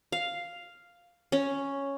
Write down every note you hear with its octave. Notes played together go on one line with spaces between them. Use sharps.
F5
C#4